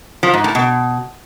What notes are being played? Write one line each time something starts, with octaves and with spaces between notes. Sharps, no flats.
F3
G#2
A2
B2